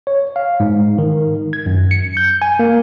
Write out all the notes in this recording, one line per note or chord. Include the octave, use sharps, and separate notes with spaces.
C#5
F5
G#2
D#3
G#6
F#2
C#7
G6
G#5
A#3